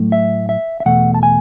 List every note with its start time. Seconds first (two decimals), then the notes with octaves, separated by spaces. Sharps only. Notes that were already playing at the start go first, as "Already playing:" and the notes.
Already playing: A2 F#3 A3
0.12 E5
0.49 E5
0.80 E5
0.86 E2 B2 A3 F#5
1.14 A5
1.23 G#5